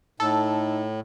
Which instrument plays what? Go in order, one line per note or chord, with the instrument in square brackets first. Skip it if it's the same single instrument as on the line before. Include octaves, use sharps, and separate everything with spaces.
[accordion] A2 [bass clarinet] D#4 [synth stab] A4